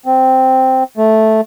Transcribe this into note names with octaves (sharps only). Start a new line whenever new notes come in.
C4
A3